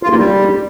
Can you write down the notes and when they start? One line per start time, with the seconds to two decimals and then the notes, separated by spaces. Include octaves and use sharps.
0.03 F4
0.10 A#3
0.17 G3